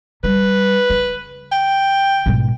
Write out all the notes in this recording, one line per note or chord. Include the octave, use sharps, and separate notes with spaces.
G3 B4
C#3
G5
G#2 B2